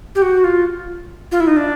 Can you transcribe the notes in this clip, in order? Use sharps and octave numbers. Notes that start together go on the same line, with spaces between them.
G4
F#4
F4
F4
E4
D#4
D4